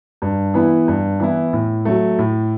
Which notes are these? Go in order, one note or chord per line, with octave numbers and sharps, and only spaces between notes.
G2
E3 B3 E4
G2
E3 B3 E4
A2
F#3 A3
A2